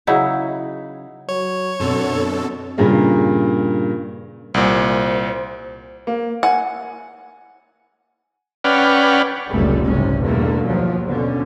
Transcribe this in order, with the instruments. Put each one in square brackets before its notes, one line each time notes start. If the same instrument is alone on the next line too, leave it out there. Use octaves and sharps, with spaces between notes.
[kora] C#3 F#3 D#4 E4
[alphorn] F#3 [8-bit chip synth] C#5
[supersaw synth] F#2 B2 A4 [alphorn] D3 [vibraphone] C4
[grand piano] G2 A#2 C#3 A#3
[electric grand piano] C2 A#2 [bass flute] C5
[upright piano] A#3
[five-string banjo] F#5 [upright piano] G#5
[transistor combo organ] C#4 B4 D5 F#5 G5 F6
[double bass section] F1 C#2 F#2 A#2 G3 A3
F#1 C2 G#2 C3 C#4
E2 G2 B2 D3 A3 A#3
D#2 F3 F#3
B2 D3 C#4